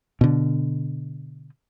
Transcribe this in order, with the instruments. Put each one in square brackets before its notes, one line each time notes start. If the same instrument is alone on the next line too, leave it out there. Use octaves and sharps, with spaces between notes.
[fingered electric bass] B2 D3